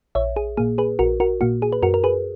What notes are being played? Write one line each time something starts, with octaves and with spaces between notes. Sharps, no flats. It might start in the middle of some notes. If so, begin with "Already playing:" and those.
A#1 C#5 E5
G#4
A#2 A#3 G#4
G#4 B4
A#1 F#4 A#4
F#4 A#4
A#2 A#3 F#4
G#4
B4
F#2 F#4 A#4
A#4
G#4 B4